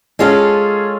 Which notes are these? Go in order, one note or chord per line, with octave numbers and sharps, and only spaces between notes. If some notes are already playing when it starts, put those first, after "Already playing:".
G#3 C#4 F4 G#4 A4